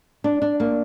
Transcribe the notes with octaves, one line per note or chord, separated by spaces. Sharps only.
D4
D4
A#3